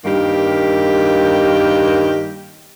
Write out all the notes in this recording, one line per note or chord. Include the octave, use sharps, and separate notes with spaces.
G2 D#3 A#3 G4